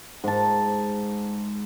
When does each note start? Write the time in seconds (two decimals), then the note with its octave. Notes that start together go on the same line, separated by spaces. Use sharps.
0.24 G#2 A5